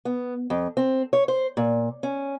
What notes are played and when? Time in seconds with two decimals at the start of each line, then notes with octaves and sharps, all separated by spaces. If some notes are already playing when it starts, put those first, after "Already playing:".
0.05 B3
0.50 F2
0.77 C4
1.13 C#5
1.28 C5
1.57 A#2
2.03 C#4